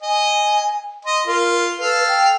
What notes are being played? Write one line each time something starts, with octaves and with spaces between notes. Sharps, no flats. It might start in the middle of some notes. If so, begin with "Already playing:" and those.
D#5 G#5
D#5 C6
F4 A#4
A4 B4 F5
G5